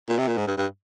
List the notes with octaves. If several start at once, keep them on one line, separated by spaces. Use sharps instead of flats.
A#2
C3
A#2
G#2
G2
G2